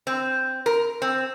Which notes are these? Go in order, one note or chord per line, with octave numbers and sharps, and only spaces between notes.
C4
A#4
C4